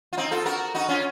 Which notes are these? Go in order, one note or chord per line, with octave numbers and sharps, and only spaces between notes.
F4
C4 D#4
F4 A4
F#4 A#4
D#4 F#4
C#4 F4